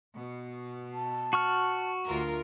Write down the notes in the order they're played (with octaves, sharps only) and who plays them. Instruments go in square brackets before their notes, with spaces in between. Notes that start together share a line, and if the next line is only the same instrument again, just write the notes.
[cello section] B2
[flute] A5
[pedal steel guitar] F#4 C#6 F6
[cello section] D2 F4 A#4